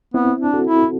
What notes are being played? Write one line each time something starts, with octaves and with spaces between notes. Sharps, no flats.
B3 C4 E4
D4
F#4 A4
E4